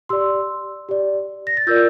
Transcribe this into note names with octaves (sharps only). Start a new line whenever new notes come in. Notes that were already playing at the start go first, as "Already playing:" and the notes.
G4 D5 C6 E6
G4 D5
A#6
A6
F4 A#4 D5 E6 G6